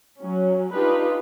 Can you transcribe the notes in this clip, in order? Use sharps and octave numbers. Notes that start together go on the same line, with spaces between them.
F#3 C#4
D4 D#4 F4 G4 B4